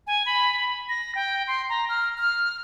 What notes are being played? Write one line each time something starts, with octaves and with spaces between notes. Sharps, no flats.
G#5
B5
A#6
G5
C6
A#5
F6
F6